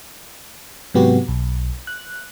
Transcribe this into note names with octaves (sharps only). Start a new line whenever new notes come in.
G#2 C3 F#3 B3 F#4 G4
B1
F#6